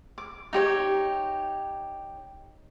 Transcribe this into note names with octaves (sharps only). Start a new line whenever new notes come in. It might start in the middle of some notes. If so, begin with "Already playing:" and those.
D6
D#4 G4 C#5